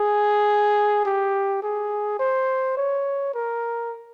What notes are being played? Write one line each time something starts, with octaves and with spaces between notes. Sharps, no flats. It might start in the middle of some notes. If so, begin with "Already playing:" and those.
Already playing: G#4
G4
G#4
C5
C#5
A#4